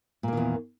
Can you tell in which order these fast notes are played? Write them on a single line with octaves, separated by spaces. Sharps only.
A#2 A#3 D#3 E2